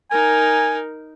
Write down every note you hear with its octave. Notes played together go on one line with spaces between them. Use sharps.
D#4 A#4 G#5